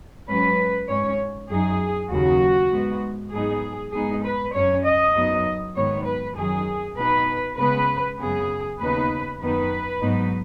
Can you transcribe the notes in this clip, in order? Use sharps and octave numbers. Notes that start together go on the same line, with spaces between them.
G#2 F#3 C#4 B4
G#2 G#3 C#4 C#5
F#2 F#3 D#4 G#4
D#2 C#3 F#3 F#4
G#2 G#3 B3
G#2 F#3 B3 D#4 G#4
G#2 G#3 B3 D#4 G#4
B4
F#2 F#3 C#4 C#5
D#5
F#2 F#3 B3 D#4
G#2 D#3 F#3 B3 C#5
B4
F#2 D#3 F#3 G#4
B2 B3 D#4 B4
C#3 G#3 B3 B4
F#2 C#3 B3 G#4
D#2 C#3 B3 D#4 B4
F#2 D#3 B3 D#4 B4
G#2 F#3 B3 D#4